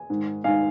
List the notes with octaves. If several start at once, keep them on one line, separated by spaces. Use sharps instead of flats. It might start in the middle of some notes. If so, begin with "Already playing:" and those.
Already playing: G#5
G#2 D#3
G#2 D#3 F5 G#5